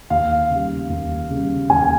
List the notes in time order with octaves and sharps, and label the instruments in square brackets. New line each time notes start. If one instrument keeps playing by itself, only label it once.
[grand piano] D#2 F5
C#3 G3
D#2
C#3 G3
D#2 G#5